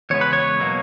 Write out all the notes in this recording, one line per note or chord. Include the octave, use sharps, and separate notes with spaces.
E2 C#3 G#3 B3 C#5
B4
C#5
B2 F#3 A#3